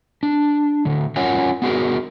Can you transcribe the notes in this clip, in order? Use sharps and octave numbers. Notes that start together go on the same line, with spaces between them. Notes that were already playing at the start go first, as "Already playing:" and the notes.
D4
A2 D3
C#4 F4 A#4 C#5 F#5 G#5
B3 F#4 G#4 A#4